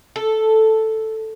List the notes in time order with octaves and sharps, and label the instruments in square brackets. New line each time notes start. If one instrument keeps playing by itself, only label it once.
[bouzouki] A4